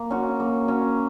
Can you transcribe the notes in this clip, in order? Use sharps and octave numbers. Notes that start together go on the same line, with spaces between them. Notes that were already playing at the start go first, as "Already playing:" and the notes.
Already playing: A#3
C#4 F#4
A#3
C#4 F#4